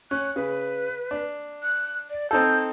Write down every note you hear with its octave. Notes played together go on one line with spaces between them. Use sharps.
C#4 F#6
C#3 B4
D4
F#6
D5
C4 D#4 A4 G6